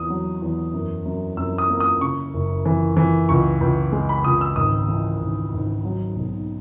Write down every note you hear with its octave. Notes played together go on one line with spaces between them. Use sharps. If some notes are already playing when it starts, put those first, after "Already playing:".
Already playing: E2 D#6
F#3
E2
F#2
F#2
F#2 E6
D#6
A#3
D#6
C#3 C#6
F#1
E3
E3
C#2 C#6
C#2
G#3
B5
C#2 D#6
E6
G#1 D#6
E3
G#1
G#1
F#3
B1